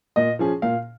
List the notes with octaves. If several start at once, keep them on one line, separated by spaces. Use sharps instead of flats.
A#2 D#5
F3 C#4 G#4
A#2 F5